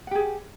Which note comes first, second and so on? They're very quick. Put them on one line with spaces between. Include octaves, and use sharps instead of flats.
F#5 G4 G#4